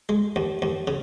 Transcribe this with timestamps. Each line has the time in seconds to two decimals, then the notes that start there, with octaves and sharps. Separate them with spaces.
0.09 G#3
0.36 D#2
0.62 D#2
0.87 C#3